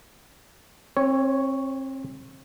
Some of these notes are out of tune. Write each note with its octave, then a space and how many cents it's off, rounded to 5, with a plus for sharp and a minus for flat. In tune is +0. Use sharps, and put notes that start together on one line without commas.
C4 +35 C#5 +0